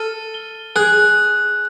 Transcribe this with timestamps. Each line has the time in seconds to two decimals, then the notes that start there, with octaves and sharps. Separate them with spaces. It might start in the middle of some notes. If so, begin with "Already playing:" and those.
Already playing: A4 F6 D#7
0.34 G7
0.76 G#4 F#6